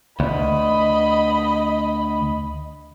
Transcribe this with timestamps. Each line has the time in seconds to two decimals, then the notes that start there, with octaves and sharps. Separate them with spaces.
0.20 D2 D#5 B5